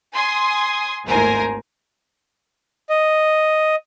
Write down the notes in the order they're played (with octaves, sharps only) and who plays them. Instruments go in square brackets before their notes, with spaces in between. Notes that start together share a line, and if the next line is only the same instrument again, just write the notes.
[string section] G#5 C6 D#6
G#1 D#2 A2 A#4 C5 G#5
[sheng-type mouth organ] D#5